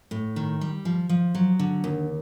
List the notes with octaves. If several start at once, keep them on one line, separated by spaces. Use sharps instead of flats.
A2
D#3
G3
F3
F3
F#3
D3
D#2